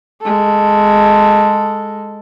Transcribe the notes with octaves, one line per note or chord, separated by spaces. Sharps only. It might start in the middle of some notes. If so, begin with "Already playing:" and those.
G#3 A4